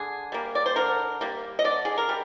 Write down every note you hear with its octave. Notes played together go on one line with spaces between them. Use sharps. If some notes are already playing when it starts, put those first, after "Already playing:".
Already playing: D3 G#4
G3 A#3
D5
C5
D3 A#4
G3 A#3
D#5
D3 D5
G#4
A#4
G3